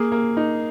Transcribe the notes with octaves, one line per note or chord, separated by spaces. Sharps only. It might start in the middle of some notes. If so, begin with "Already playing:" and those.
Already playing: A#3 G#4
A#3
D#4